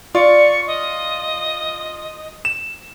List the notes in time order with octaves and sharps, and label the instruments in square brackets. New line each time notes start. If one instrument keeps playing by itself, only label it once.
[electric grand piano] F4 [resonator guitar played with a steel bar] D5 [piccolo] C#6
[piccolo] D#5
[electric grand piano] E7